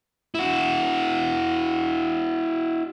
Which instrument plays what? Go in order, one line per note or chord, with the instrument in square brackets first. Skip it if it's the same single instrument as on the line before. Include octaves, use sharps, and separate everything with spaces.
[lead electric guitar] E4 F#4